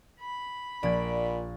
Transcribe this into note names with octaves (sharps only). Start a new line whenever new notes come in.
B5
A#1 A#2 D5 G#6 D7